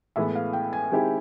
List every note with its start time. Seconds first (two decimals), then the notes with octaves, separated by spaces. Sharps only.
0.16 A2 E3 G#3 B3 E5
0.35 F5
0.53 G5
0.73 G#5
0.92 D#3 G#3 C4 E4 G4